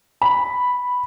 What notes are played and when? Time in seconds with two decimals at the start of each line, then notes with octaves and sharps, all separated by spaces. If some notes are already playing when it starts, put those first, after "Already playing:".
0.22 B5